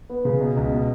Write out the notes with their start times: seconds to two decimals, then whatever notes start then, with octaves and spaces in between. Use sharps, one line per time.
0.10 B3
0.25 C#3
0.41 B2
0.57 C#2
0.73 B2